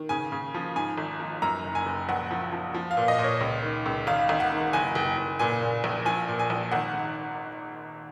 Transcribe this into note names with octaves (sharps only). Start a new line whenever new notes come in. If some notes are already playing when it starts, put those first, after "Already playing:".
Already playing: D#3
C#3 G#5
C#3
F3
G#2 G#5
G#1
F3
F#2 A#5
F#1
G#5
F#1
A#1 F#5
F3
F3
F3
F5
A#2
D#5
A#2
C#5
C#2
D#3
C#2
G#1 F5
G#1
F#5
D#3
F#1 G#5
F#1
F#1
A#2 G#5
A#2
A#1
F3 G#5
A#2
G#5
A#1
G#1 F#5
G#2